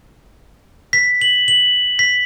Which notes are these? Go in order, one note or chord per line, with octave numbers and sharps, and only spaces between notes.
B6
F#7
F#7
B6